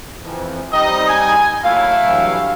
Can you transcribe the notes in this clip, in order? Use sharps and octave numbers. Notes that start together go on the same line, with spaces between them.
F2 E3 F3
G3 C4 D#4 D#5
G#5
F#3 A3 A#3 E4 F5
G2 E3 F#3